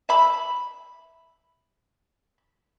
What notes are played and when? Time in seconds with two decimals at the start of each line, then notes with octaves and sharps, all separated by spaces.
0.09 E5 B5